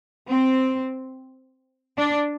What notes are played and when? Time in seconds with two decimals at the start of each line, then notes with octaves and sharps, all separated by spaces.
0.29 C4
1.97 D4